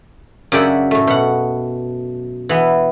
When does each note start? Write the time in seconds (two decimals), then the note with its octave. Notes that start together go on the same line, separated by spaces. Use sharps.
0.52 F#2 C#3 G4 D5 E5 F#5
0.91 A2 A3
1.07 B2 F#5
2.49 E3 B3